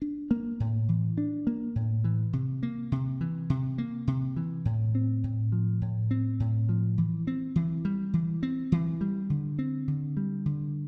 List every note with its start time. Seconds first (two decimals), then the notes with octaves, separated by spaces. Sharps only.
0.02 D4
0.31 A#3
0.60 A2
0.89 E3
1.18 D4
1.47 A#3
1.76 A2
2.04 E3
2.33 C3
2.63 A#3
2.92 C3
3.21 E3
3.50 C3
3.78 A#3
4.08 C3
4.36 E3
4.65 A2
4.95 C4
5.24 A2
5.52 F3
5.81 A2
6.11 C4
6.40 A2
6.69 F3
6.98 E3
7.27 C4
7.56 E3
7.85 G3
8.13 E3
8.43 C4
8.72 E3
9.01 G3
9.30 D3
9.59 C4
9.88 D3
10.17 G3
10.46 D3